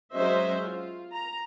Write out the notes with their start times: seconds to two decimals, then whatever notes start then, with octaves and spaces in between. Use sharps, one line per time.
0.14 F#3 G#3 C#4 C5 D#5 E5
0.62 F4
1.11 A#5